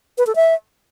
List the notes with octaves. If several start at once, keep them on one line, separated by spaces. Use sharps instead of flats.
B4
A4
E5